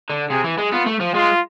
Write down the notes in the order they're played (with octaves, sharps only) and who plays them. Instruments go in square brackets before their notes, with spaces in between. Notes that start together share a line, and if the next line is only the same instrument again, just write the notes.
[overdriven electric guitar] D3
[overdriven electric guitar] C3 [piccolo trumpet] G#4
[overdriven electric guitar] E3
G#3
[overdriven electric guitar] B3 [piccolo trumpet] F4
[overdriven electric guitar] A3
F3
[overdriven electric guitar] G#3 [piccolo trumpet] F4